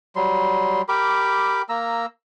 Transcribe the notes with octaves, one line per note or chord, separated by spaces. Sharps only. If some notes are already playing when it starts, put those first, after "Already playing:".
F#3 G3 C6
G4 A#4 B5 D6
A#3 A#5 E6